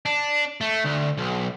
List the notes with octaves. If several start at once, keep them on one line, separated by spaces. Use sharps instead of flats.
D4
A3
D2
B1